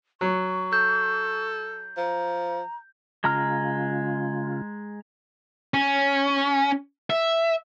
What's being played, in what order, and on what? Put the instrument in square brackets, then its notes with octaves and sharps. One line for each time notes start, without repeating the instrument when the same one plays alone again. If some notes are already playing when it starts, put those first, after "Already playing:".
[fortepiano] F#3 [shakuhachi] C#6
[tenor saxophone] A4 [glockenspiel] G6
[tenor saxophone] F3 [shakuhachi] A#5
[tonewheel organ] C#3 F4 [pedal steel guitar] G#3 A#5 F6
[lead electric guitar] C#4
E5